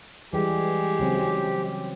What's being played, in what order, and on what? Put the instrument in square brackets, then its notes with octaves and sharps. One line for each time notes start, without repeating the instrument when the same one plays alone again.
[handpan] E3 G3 G#4 [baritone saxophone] G#3 [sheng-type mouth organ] G4
[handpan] C#3 F#3 C4